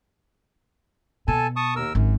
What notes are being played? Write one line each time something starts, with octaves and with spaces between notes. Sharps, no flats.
B2 A4 G#5 A5
A5 C#6 D#6
D#2 A#4 E6
G#1 F#2